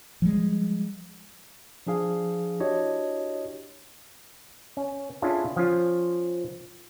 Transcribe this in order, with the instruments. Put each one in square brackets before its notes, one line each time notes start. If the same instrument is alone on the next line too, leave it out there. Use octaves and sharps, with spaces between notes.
[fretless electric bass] F3 G3 G#3
[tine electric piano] F3 D4 G#4 F5
D4 E4 F#4 G4 C#5 D#5
[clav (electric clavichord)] C#4
C#4 D4 E4 F4 G#4 A4
F3 C#4 F4